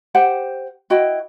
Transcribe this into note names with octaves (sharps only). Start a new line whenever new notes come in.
G4 C5 F#5 G5
E4 F#4 D#5 G5